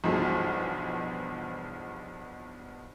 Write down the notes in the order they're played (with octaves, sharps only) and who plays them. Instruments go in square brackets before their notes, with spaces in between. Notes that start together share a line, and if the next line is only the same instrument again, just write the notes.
[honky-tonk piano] B1 G2 B2 E3 F3 G#3